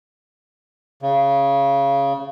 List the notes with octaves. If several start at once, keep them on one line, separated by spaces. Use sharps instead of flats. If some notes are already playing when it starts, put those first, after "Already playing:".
C#3